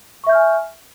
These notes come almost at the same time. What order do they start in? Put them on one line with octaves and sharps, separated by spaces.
C#6 E5 G6 F6 G#5